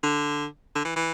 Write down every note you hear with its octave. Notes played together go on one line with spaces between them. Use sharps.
D3
D3
E3
E3